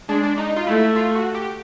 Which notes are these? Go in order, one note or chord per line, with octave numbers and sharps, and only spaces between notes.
G#3 D4
D4
D#4
F4
A3 E4
F4
F#4
G4